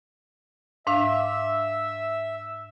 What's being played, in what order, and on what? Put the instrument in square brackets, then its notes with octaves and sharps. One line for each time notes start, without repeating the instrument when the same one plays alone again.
[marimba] G#2 D4 F5 [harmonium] E5